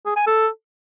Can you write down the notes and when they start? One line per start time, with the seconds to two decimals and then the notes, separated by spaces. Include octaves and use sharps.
0.06 G#4
0.16 G#5
0.27 A4